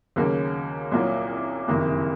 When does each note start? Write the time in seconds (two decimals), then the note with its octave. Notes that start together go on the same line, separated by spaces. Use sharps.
0.16 D#2 C#3 F#3 A#3 C#4
0.91 C2 A#2 F#3 A#3 F4
1.68 F#1 F2 C3 D#3 A#3